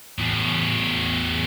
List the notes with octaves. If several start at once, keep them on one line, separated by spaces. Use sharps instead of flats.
E2 A2